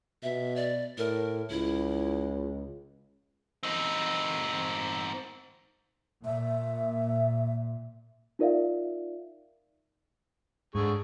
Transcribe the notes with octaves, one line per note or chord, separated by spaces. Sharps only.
B2 E5
D5
A2 A#4
C#2 E4
C4 D#4
A#2 E5
D#4 F4 A#4 D5 E5 F5
G#2 D3 G#4 C#6